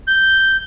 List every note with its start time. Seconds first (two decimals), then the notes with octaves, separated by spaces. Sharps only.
0.08 G6